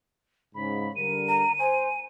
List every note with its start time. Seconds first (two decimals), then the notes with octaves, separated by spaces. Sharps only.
0.55 G#2 C#3 B5
0.96 D3 G3 A#4 D#7
1.29 A#5
1.60 C5 G#5